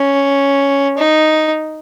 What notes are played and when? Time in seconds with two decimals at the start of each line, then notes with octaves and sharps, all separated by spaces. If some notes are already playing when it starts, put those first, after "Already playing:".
Already playing: C#4
0.98 D#4